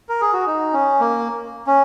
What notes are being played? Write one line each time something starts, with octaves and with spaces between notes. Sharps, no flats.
A#4
G#4
F#4
D#4
C#4
A#3
C#4